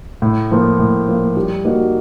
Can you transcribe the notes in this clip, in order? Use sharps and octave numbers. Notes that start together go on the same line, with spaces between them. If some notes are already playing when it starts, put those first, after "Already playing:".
A2
F3 A#3
A2
F3 A#3
G3
A#3 D#4 F#4